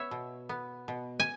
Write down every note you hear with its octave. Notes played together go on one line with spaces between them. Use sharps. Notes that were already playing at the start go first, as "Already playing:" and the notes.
Already playing: B3 C#5 E5
B2
B3
B2
G#5